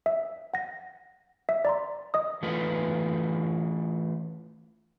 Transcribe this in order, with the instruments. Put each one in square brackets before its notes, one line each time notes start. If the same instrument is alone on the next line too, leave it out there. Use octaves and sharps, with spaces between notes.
[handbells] E5
F#5 A#6
E5
D5 A#5 C6
D#5 D#6
[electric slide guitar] E3 A3 F4 B4